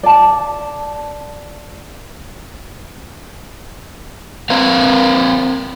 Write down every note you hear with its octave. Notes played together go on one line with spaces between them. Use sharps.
D5 A5
C4 A#4 B4 F5